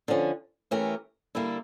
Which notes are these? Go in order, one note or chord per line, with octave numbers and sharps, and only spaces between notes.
D3 F3 C#4
E3 A3 C#4 G4 A#4
D3 G3 A#3 E4 A4